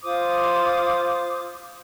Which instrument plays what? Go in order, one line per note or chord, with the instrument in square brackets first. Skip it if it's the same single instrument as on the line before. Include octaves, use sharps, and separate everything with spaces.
[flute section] F4 C5 D6 D#6